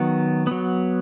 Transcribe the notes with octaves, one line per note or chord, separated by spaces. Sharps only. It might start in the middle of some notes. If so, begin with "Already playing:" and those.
Already playing: D#3 F#3 B3
F#3 B3